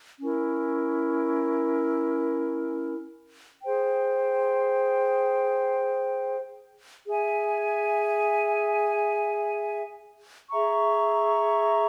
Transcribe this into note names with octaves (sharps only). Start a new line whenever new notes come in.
C#4 E4 A#4
G#4 C5 G5
G#4 E5 G#5
G#4 E5 A#5 C#6